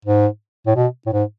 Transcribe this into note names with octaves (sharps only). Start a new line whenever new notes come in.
G#2
A2
B2
A2
G#2